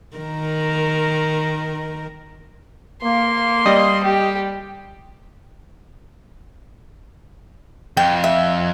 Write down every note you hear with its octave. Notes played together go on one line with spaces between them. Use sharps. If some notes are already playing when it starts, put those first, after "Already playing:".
D#3 A#4
A#3 C6
G3 D#5
G4
F2 G5
E5